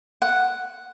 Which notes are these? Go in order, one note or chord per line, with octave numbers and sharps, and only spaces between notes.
F#5